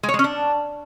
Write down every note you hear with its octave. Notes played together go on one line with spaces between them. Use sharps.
G#3
C#5
G#3
C#4
D4